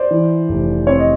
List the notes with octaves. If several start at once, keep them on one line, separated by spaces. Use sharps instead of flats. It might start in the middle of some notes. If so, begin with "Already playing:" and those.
Already playing: C5 D5
E3
F1
C4 C#5
D#5